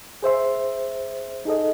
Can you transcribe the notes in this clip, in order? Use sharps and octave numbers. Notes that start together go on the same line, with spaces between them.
G#4 C5 E5 C6
D#4 G#4 A4 D#5